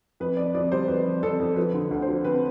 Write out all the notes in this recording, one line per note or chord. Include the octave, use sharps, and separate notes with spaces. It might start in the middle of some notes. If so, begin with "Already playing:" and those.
F2 B4
F2 D5
F2 D5
G3 C5
F2 B4
F2
F2 A4
F2
F3 B4
D3
D2
C5
F3
C4 B4